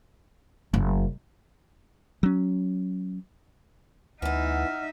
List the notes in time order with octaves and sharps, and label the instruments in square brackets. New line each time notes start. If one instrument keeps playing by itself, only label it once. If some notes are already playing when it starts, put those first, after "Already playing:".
[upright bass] F#1
[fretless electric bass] F#3 C#4
[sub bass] D2 [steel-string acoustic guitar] E3 B3 [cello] D#4 E5 [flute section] F#5 F6